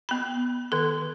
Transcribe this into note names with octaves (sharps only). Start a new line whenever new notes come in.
B3 B5
D#3 A4